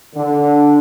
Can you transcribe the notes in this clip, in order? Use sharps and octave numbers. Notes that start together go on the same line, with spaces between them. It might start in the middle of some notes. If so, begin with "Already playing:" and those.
D3